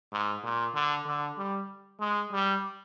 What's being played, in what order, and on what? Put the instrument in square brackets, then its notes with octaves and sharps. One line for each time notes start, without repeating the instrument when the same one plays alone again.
[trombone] G#2
A#2
D3
D3
G3
G#3
G3